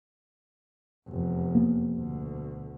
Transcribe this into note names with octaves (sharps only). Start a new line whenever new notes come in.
F1 E2
A#3 B3
D2 B2